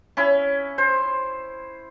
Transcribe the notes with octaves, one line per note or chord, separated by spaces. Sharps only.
C#4 E4 B5
C5